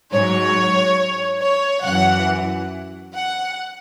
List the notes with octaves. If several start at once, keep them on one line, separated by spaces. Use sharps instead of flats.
G#2 F#3 C#5
C#5
F#2 E3 F#5
F#5